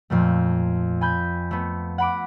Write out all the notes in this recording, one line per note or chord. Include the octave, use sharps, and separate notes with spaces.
F2 A#2 A3
G#5 B5 G6
A3 B3
F#5 B5 D6